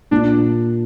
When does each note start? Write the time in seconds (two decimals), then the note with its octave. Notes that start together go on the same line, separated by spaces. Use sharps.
0.11 A#2 D4